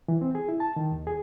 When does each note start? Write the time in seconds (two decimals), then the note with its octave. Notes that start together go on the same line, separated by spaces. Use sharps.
0.08 E3
0.21 C4
0.35 G#4
0.49 E4
0.60 A5
0.76 D#3
0.92 D#2
1.07 G#4